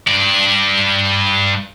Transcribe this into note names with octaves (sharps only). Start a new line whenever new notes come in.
G2 D5